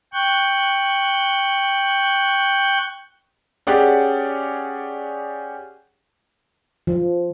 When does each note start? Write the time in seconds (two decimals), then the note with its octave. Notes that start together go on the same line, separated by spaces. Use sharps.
0.13 G5 C#6 F#6 G6
3.67 C#4 G4 G#4 D5 F#5
6.87 F3